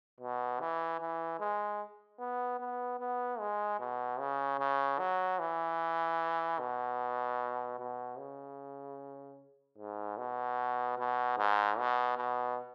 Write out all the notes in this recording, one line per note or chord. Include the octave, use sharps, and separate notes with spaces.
B2
E3
E3
G#3
B3
B3
B3
G#3
B2
C#3
C#3
F#3
E3
B2
B2
C#3
G#2
B2
B2
G#2
B2
B2